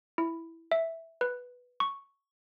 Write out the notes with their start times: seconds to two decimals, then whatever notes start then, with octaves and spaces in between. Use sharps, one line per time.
0.18 E4
0.72 E5
1.21 B4
1.80 C#6